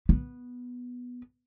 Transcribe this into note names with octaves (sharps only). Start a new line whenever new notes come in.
B3